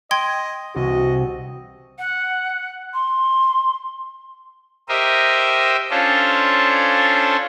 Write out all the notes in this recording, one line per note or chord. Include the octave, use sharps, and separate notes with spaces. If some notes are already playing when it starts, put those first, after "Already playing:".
D#5 G5 C6 G#6
C2 F#4 D#5
F#5
C6
G4 A#4 C5 D#5 E5
C#4 D4 F4 A4 C5 C#5